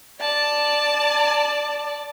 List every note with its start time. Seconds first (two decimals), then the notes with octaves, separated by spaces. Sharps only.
0.20 D5 A5